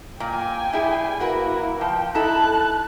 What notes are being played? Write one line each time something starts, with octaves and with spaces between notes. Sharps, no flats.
A#2 G5 G#5
G3 E4 G#4
A#3 E4 F#4 A#4 B4
F3 G5
D#4 E4 A4 A5 F#6